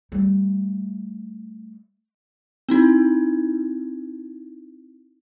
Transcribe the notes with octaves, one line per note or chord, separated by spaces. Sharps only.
G3 A3
C4 D#4 E4